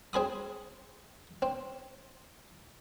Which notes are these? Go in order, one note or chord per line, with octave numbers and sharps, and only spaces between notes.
C4 G#4 B5 D#6
C4